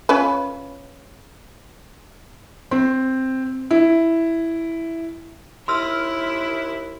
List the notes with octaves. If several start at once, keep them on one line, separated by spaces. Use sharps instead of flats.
C#4 F4 B4
C4
E4
D#2 E4 C6 E6 F6